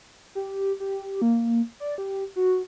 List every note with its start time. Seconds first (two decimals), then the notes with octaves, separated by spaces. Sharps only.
0.35 G4
0.80 G4
1.22 A#3
1.80 D5
1.98 G4
2.36 F#4